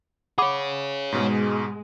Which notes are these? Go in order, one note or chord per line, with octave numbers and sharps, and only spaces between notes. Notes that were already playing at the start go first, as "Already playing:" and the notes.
G#4 C#5 F#5 B5 D6
G#2 B2 G#3